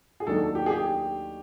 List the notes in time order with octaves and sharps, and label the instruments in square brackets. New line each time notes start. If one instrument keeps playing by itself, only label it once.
[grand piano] G#4
D#2 D#3 F#3 A3 D4 A4
G4
G#4
G4